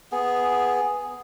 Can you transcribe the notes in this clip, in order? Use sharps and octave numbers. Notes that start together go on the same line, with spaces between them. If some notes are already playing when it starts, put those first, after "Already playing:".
B3 G#4